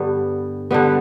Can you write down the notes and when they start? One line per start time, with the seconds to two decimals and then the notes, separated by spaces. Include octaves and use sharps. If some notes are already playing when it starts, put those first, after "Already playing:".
Already playing: G2 D3 G3 B3
0.71 D3 G3 B3